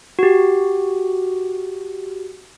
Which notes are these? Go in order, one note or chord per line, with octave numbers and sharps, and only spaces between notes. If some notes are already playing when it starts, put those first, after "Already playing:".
F#4 G4